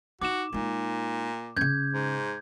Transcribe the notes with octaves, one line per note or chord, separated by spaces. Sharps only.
D#4 F#4 D6 E7
A#2 G#3 D#4
C#3 C#4 G6 G#6
G#2